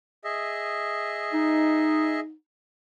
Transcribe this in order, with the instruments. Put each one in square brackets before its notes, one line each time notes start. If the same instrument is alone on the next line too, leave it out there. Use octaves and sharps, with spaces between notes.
[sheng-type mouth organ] G#4 D#5 E5
[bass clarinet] D#4